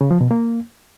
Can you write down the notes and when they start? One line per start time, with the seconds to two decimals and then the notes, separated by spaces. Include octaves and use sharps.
0.01 C#3
0.11 F3
0.21 B2
0.31 A#3